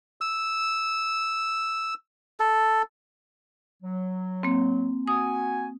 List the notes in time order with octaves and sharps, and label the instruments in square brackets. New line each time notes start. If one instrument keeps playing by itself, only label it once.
[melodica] E6
A4
[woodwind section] F#3
[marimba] A#3 C4
[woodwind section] F#4 G#5 [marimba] D#6